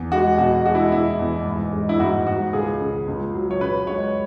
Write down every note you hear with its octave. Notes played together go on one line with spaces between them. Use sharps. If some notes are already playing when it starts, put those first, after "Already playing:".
Already playing: E2
G#3 F#4
B2 F#4
G#3 F#4
E4
E2 E4
E2
G#2
G#3
E4
G#2 F#4
G#2 F#4
C#2 G#4
C#3
C#2
F#3
C#5
C#3 B4
G#3 C#5